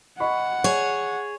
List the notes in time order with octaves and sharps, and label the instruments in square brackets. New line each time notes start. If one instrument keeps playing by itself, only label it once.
[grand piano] D#5 B5 C#6 [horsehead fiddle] F#5
[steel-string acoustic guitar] G#4 C#5